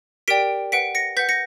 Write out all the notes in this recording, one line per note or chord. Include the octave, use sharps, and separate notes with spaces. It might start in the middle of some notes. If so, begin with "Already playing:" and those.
G4 A#4 D5 G5 B6 D7
B4 F#5 B6 D7
A#6 C#7
B4 F#5 G6 B6
A#6 C#7